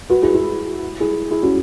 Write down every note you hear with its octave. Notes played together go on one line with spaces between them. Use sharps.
F#4 B4
E4 G#4
E4 G#4
E4 G#4
E4 G#4
C#4 F#4